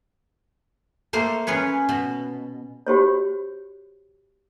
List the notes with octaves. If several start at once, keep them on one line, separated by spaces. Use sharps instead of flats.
A3 A#3 C5
C#4 G#4 B4 C#5
B2
F#4 G4 C5 C#5